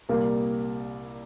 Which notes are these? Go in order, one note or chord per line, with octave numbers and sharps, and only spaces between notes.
C2 A#2 G3 A#3